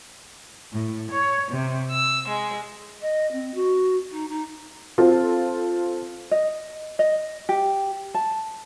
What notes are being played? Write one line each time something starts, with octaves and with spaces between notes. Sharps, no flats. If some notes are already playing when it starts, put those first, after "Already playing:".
A2
C#5
C3
E6
G#3
D#5
C4
F#4
D#4
D#4
C4 F4 A4
D#5
D#5
G4
A5